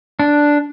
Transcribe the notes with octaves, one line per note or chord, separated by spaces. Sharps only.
D4